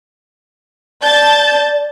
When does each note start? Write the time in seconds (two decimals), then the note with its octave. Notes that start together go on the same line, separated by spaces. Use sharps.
1.02 D5 A5 G6 A6